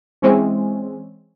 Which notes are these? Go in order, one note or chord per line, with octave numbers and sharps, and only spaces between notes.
E3 G#3 C4 C#4